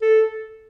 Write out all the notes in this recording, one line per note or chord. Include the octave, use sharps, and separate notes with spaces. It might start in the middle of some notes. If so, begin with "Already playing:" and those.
A4